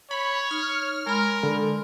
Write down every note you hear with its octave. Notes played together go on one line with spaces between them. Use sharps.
C#5 B5
D#4 F6
G#3 A#4 B5 C6
D3